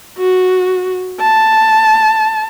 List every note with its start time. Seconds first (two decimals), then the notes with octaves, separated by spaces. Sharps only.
0.18 F#4
1.21 A5